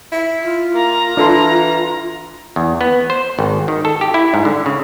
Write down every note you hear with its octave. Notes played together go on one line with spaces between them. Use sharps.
E4
F4
A#3 A#5
E3 D4 A4 C6
E2
B3
C5
G#1
D#3
A4
G4
E4
G#2
D3
C#3